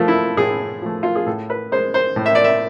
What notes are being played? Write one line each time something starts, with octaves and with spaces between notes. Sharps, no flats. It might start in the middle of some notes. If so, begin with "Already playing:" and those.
Already playing: F3 A3 F4
E4
A2 G#4
F3 A3
F4
G#4
A2 A4
B4
G#3 C5
C5
A2
E5
D5
E5